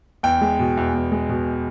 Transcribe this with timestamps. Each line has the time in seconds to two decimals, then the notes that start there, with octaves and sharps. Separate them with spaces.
0.23 E2 G5
0.41 G#3
0.59 B2
0.77 E2
0.94 E2
1.12 G#3
1.29 B2